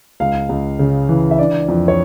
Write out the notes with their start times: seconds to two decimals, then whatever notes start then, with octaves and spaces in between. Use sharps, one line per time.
0.20 C#2 F5
0.49 C#2
0.79 C#3
1.09 E3
1.31 E5
1.39 D4 D5
1.68 F2
1.88 C#5